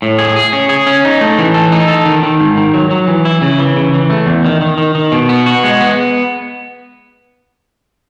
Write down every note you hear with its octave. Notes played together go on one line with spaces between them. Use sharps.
A2
G#4
G#4
C#4
G#4
C#4
D#4
A3
E3
A4
D#4
A4
D#3
D#3
G#2
D#3
F#3
F#3
E3
E4
C#3
E3
C#3
E3
A3
E2
D#3
D#3
D#3
D#3
B2
B3
F#4
G#3
B3